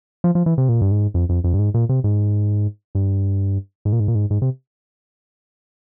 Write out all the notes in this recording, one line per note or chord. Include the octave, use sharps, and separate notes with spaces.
F3
F3
E3
C3
A#2
G2
G#2
F2
F2
F2
G2
G#2
A#2
C3
G#2
G2
G#2
A#2
G#2
A#2
G#2
G#2
C3